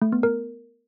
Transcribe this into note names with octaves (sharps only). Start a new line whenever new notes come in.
A3
B3
A#4